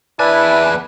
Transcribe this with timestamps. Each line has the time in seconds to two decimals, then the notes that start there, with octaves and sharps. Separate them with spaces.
0.19 E2 E4 B4 D5 G#5 A5